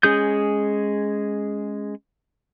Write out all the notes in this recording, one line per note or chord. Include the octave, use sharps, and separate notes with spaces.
G#3 C#4 G#4 D#6 G6